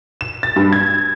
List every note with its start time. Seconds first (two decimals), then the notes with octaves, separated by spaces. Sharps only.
0.21 E7
0.43 A6
0.56 G2
0.73 G#6